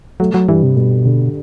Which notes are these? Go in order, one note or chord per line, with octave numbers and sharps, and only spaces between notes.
F#3 A3
F#3
G2 E3
C3
G2 B2
D3